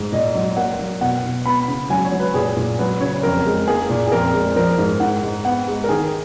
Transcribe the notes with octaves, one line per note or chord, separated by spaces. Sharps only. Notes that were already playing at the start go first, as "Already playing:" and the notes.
Already playing: G#2
A#2 D#5
F#3
A#3 F#5
F#3
B2 F#5
B2
B3 B5
C#3
F#3 G#5
C#5
F#3
B4
A#2 G#4
A#2
F#3 B4
C#3 C#5
F2 A#4
G#3
A#3 G#4
A#2
G#4
F2 A#4
G#3
F3 A#4
G#2
G#2 F#5
G#2
B3 F#5
G#3
A#4
D#3 G#4